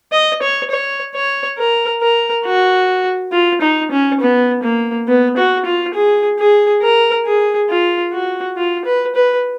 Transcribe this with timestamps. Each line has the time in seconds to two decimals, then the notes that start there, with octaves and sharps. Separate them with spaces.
0.12 D#5
0.42 C#5
0.71 C#5
1.15 C#5
1.58 A#4
2.01 A#4
2.45 F#4
3.32 F4
3.62 D#4
3.92 C#4
4.21 B3
4.63 A#3
5.08 B3
5.37 F#4
5.66 F4
5.94 G#4
6.39 G#4
6.82 A#4
7.26 G#4
7.70 F4
8.13 F#4
8.57 F4
8.85 B4
9.15 B4